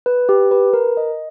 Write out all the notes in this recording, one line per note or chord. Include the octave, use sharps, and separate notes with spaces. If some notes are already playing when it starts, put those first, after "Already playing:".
B4
G4
B4
A#4
D#5